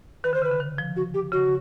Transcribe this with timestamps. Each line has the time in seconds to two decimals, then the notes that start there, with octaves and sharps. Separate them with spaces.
0.24 D#3 B4
0.33 D3 C5
0.42 C#3 B4
0.51 D3
0.60 D#3
0.78 F3
0.96 F#4
1.14 G4
1.32 C#3 F#4